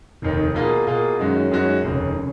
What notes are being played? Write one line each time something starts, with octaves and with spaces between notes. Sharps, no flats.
F1 D#2 D#3
B2 A#3 F4 G#4
B2 A#3 F4 G#4
F#2 D#3 G#3 C#4 F#4
F#2 D#3 G#3 C#4 F#4
F1 D#2 C#3
C#3